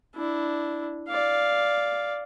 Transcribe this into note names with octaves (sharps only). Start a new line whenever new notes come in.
D4 E4
D5 F5